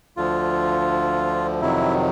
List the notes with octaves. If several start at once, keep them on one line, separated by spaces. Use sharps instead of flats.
D2 D3 F3 F4
F2 C3 D#3 F#3 E4